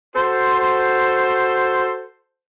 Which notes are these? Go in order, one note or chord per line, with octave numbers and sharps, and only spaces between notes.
F#4 A4 C5